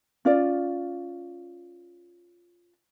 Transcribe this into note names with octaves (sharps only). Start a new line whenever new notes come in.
C#4 F4 D5